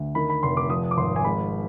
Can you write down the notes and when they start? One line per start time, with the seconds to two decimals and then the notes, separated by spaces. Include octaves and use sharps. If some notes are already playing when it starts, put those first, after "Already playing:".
Already playing: D2
0.15 D#3 B5
0.29 B5
0.43 F1 C6
0.57 D6
0.70 F3 D#6
0.91 D6
0.97 G#1 C6
1.16 G#5
1.24 G#3 B5